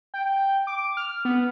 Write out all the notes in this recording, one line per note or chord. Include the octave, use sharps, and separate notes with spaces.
G5
D6
F6
B3